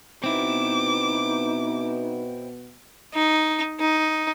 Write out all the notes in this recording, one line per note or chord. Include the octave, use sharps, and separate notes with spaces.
B2 B3 C4 D#4 E4 D6
D#4
D#4